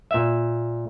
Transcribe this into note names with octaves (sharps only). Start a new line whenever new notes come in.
A#2 E5